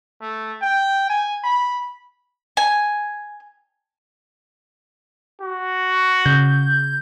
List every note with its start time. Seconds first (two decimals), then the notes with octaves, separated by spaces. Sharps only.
0.22 A3
0.62 G5
1.09 G#5
1.44 B5
2.57 G#5
5.41 F#4
6.26 C#3 G6